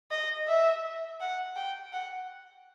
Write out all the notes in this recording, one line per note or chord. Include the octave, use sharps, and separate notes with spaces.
D#5
E5
F#5
G5
F#5